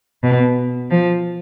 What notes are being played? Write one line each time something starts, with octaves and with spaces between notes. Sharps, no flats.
B2
F3